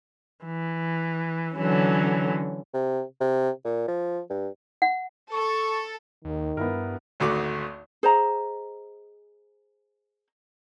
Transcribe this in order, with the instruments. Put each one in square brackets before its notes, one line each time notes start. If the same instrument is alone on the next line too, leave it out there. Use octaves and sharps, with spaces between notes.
[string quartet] E3
D3 E3 F#3 C#4
[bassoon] C3
C3
A#2
F3
G2
[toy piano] F#5
[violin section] A4 [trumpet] C#6
[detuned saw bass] D#2 [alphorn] D#3
[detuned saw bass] G2 [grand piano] B3 E4 A#4
[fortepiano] G#1 D2 A3 F#4 D6
[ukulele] G#4 C5 D#5 A#5